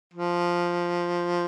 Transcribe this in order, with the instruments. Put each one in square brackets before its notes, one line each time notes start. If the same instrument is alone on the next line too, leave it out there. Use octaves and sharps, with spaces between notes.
[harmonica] F3